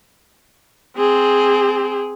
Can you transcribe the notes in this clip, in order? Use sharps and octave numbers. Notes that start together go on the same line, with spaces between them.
C4 G#4